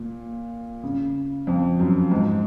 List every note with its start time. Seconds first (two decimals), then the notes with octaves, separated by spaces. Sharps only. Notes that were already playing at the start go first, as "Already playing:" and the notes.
Already playing: A#2
0.83 C#3
1.47 F2
1.79 F#2
2.11 G#2